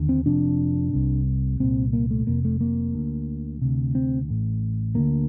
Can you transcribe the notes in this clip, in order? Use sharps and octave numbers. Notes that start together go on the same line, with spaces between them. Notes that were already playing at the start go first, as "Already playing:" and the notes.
Already playing: D#2 D3
C4
F1 F2 C3 D4
C2 C3
C2 A#2 C4
A#3
A3
F1 F2 C3 A#3
A3
A#3
D2 D3
D2 C3
C4
A1 A2
D2 D3 A#3